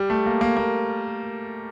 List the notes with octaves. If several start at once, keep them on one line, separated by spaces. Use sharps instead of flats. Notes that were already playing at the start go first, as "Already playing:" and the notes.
Already playing: G3
A3
A#3
A#3
A#3